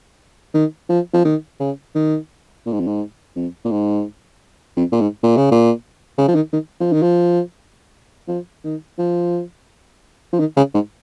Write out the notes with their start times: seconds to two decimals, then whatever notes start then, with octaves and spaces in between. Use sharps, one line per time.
0.54 D#3
0.89 F3
1.14 F3
1.25 D#3
1.60 C#3
1.95 D#3
2.66 A#2
2.73 G#2
2.80 F2
2.87 G#2
3.36 F2
3.65 A#2
3.71 G#2
4.77 F2
4.92 A#2
5.01 G#2
5.23 A#2
5.37 C#3
5.51 A#2
6.18 C#3
6.28 F3
6.35 D#3
6.53 D#3
6.81 F3
6.92 D#3
7.02 F3
8.28 F3
8.64 D#3
8.98 F3
10.33 F3
10.40 D#3
10.57 C#3
10.74 G#2